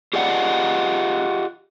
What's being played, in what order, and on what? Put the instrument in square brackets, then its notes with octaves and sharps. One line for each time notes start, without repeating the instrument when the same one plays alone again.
[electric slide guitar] F4 G4 G#4 D5 D#5 F#5